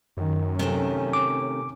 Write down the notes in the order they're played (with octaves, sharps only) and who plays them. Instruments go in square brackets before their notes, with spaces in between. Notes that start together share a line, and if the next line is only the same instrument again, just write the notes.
[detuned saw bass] F#2 [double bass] D#3
[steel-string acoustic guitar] C3 D#3 A3 [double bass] C#4
[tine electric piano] D6